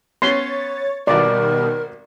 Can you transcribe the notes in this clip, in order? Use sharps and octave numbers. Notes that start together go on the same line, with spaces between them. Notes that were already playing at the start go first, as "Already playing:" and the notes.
B3 C#4 C#5 C6 A6
G#1 B2 D#3 G3 F#4 A#4 D5